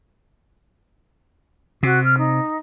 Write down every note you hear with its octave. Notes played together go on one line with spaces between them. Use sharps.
C3 F#4
F6
D#4